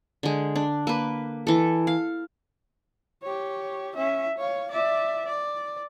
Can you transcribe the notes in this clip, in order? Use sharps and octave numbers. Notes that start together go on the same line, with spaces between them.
D3 G#3
D4
A#3 B4
E3 A4
F5
G4 C#5
C#4 E5
C#5 F5
D5 E5
D5